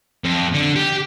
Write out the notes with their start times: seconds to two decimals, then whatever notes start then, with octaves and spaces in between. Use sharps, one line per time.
0.24 F2
0.54 D3
0.76 G4